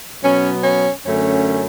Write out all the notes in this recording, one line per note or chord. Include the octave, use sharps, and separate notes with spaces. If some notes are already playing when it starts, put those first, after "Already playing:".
B2 F#3 B3 C#4
C#4
F#2 D3 A3 C#4